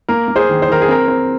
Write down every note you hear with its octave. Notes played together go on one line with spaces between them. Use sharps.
A#3 A#4
A#3
G#4 C5
D#3
C5
D#3 A#4
G#4
C4 A#4
C4